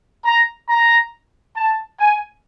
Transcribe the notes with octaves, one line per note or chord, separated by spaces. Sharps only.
A#5
A#5
A5
G#5